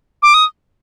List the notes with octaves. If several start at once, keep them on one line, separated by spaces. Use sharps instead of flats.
D6
D#6